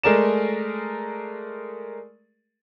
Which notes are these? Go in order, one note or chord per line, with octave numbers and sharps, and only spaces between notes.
G#3 A3 G#4 A#4 D5 E7